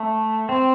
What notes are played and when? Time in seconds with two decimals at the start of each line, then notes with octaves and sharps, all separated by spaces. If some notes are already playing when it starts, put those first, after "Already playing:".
Already playing: A3
0.49 C4